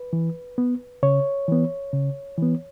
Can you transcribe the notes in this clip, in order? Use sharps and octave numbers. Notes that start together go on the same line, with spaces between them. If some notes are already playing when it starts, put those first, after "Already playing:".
Already playing: B4
E3
B3
C#3 C#5
E3 B3
C#3
E3 B3